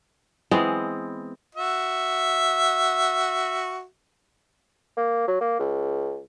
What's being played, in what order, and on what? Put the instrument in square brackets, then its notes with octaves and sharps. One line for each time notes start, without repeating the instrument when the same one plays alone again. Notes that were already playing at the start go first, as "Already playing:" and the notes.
[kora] E3 G#3 B3 C4
[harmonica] F#4 E5
[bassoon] A#3
F#3
A#3
C#2